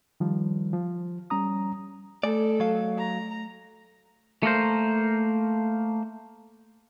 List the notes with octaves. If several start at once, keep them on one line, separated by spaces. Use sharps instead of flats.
D#3 F3 G3
F3
G3 C#4 A#5 D#6
A3 A4 D5 G#5
F#3 F5
A#5
A3 A#3 A#4 C5